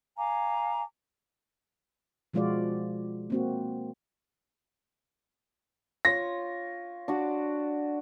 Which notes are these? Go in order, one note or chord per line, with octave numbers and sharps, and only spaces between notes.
F5 G#5 A#5 D6
B2 F3 G#3 F4 F#4 D5
A#3 C4 F#4
F4 C#5 A#6
D4 F#4 D5